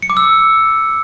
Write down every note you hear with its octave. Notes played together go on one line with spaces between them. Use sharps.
C#7
D6
E6